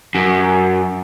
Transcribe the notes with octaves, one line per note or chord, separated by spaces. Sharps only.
F#2